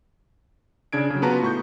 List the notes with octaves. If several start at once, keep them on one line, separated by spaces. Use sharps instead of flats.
C#3 D4 G#6 D7
C#3 F#3
B3 F4 F#4 B4 A5 A#5
A2 C#6 G6